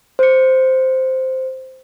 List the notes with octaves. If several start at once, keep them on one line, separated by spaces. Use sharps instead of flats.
C5 C#7